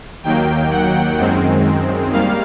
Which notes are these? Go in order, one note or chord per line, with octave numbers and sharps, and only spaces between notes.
D#2 D#3 F#3 A#3 G5
F#5
F#2 D#3 G#3 C4
D#3 G3 A#3 F5